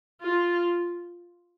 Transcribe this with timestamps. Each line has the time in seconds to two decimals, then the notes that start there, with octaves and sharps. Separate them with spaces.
0.21 F4